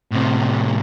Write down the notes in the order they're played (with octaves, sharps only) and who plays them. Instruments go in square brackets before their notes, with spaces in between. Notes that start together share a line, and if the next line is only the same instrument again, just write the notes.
[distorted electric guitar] A2 C3